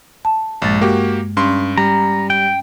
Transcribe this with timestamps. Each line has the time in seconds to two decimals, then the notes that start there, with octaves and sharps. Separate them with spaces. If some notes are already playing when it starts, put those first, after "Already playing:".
0.25 A5
0.62 A#1 G2 G#3 A6
0.81 A#3 F#4 G4
1.37 G2 C#4 C6
1.78 G3 A#5
2.30 G5